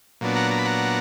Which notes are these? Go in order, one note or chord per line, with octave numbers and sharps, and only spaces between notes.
A#2 F#3 B3 D4
F#5 A#5
A#5
B5
F#5 A#5